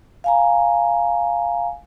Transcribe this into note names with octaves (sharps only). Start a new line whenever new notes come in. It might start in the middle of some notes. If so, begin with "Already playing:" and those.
F5 G#5 A#5